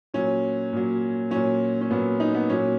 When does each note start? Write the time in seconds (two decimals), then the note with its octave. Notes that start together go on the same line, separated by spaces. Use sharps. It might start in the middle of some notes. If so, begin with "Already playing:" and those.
0.14 A#2 F#3 C#4
0.73 A#2 F#3
1.31 A#2 F#3 C#4
1.81 C#4
1.90 A#2 F#3 B3
2.20 D#4
2.35 B3
2.49 A#2 F#3 C#4